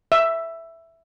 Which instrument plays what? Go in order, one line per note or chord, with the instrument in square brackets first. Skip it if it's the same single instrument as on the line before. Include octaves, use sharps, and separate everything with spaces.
[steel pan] E5